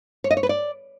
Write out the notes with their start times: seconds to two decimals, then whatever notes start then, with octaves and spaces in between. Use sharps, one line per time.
0.24 C#5
0.31 D#5
0.37 C#5
0.43 B4
0.49 D5